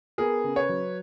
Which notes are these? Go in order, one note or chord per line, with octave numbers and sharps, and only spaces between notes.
B3 G#4 A#4
C#3
B4 C#5
F#3